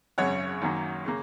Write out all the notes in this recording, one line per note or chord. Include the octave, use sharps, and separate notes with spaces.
G#1 F#2 C#3 C#5 F#5
F#2 D#3 F#3 A#3
C#3 A#3